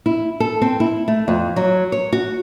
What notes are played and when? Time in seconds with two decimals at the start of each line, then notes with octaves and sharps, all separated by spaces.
0.06 E4
0.40 A4
0.62 C4
0.80 E4
1.08 A3
1.28 F2
1.56 F#3
1.92 C#5
2.12 F#4